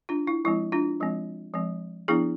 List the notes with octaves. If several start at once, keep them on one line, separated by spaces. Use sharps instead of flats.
D4 F4
E4
F3 G#3 C4 E4
D4 F4
F3 G#3 C4
F3 G#3 C4
F3 B3 D4 E4 G#4